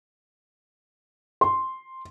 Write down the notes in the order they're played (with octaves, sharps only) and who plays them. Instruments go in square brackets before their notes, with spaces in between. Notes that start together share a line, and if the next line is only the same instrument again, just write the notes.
[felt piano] C6